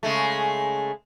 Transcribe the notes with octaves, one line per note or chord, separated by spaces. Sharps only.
C#3 G#3 A3